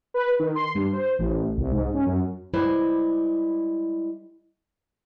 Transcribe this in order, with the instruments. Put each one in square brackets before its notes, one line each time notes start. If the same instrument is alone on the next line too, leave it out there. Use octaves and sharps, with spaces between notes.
[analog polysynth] B4
D#3
C6
G2
C5
A1
C2
G#2
C#4
F#2
[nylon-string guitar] G3 G#3 E4 B4 C5